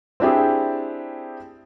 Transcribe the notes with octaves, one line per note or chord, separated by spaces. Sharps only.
C4 D4 E4 G4 G#4